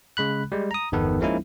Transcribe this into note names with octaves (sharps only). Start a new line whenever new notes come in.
C#3 G#3 B5 F#6
G3 G#3
A#5 D#6
G1 E2 D#3 B3 A4 B4
F3 G#3 A#3 C#4 D#4 E4